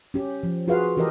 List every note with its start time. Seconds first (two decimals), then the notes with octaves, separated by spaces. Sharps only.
0.14 C#4 G4
0.43 F3
0.68 F4 F#4 G#4 B4 F5
0.97 E3 G4 A4 A#4 D#5